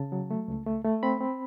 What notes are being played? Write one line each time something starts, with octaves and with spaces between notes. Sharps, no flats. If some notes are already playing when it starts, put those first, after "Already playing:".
Already playing: C#3 A5
F#3
A3
C#2
A3
A3
C4 B5
C4